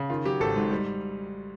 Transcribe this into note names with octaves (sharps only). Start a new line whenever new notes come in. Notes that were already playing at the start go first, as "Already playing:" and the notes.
Already playing: C#3
D#3 F4
F#3 G4
G#1 A4
G#2
G3